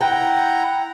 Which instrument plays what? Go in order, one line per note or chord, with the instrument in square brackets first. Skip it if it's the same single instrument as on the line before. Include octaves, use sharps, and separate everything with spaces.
[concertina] E4 F#5 A#5 [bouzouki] G5